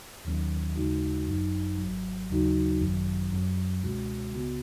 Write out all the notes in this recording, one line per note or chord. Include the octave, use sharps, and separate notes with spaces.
D#2 D#3 F#3 C#4
D#2 C#3 G#3 D#4 F#4
G#1 F#2 F#3 D#4
G#1 G#2 F#3
D#2 C#3 F#3 D#4 F#4
G#1 F#2 D#3 F#3
F#2 F#3 C#4
C#2 B2 G#3 C#4 F#4
C#2 C#3 B3 F#4